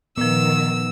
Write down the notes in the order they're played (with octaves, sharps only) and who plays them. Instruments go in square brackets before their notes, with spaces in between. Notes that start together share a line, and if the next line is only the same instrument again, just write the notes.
[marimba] A#2 F3 [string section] D#3 [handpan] B3 [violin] E6